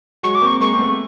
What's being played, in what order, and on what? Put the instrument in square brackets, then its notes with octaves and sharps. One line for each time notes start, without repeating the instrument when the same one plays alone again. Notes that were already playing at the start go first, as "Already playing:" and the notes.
[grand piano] F#3 G#3 [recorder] C#6
[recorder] D6
[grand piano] A#3 C4 [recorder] C#6
[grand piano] G#3 A#3 [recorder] C#6
[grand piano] C4
A3 B3